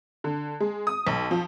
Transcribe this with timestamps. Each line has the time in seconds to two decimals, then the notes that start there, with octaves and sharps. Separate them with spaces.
0.24 D3
0.60 G#3
0.87 D#6
1.07 B1
1.31 F3